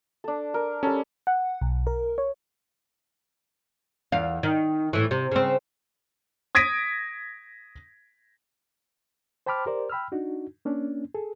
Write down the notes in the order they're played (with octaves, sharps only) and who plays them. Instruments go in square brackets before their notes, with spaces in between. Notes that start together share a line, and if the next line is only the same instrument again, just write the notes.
[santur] D4 A4
A#4
[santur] G3 A4 [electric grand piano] C#4
[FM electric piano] F#5
B1
A#4
C#5
[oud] E2 F5
D#3
A2 E3
C3
C#3 C4
[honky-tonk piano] D#6 G#6 A#6 B6 D7
[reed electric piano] C5 G5 A5 B5 D6 F6
G4 A#4 C5 D5
G5 B5 E6 F6
D4 D#4 F#4
A#3 C#4 D4
G#4 A4